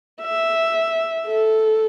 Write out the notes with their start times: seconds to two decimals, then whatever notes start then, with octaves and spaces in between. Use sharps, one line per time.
0.22 E5
1.28 A4